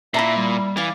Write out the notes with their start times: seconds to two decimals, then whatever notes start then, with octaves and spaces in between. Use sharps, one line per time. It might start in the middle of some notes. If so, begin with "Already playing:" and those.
0.14 A#2 E4 A4 E5 A#5
0.37 G3
0.77 E3 D5 F5